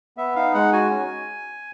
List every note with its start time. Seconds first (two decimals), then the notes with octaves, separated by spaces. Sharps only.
0.17 B3 E5
0.36 D#4 F5
0.54 G#3 F#5
0.73 F#4 G#5
0.90 C#4